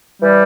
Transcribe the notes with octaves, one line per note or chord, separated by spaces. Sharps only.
E3 G3